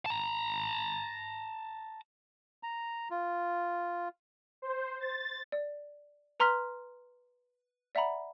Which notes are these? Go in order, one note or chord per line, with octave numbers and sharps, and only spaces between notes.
A5 A#5
A#5
F4
C5
A6
D5
B4 A#5 C6 F6 B6
D5 E5 F#5 A#5 B5